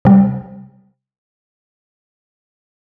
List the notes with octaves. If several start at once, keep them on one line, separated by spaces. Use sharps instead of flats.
C3 G3